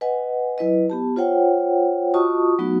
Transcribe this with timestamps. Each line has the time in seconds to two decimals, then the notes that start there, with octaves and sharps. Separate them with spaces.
0.01 B4 D#5 F#5 G#5
0.58 F#3 E4 B4 D#5
0.90 B3 G4 A5
1.16 F4 C5 C#5 F#5 G5
2.14 F4 F#4 D#5 A5 C#6 D#6
2.59 F#3 A3 B3 D#4 F#4